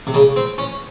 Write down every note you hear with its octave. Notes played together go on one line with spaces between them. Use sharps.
C3
C#3
C4
C#4